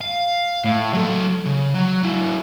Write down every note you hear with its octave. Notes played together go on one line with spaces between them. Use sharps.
F5
A2
F#3 A4
C#3
F#3
F#3 E4